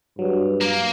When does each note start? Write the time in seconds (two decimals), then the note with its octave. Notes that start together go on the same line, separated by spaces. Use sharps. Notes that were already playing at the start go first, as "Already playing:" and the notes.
0.19 G2 F#3
0.61 A#3